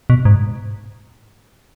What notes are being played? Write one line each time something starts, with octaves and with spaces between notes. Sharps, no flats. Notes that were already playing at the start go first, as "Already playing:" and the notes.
B2
G#2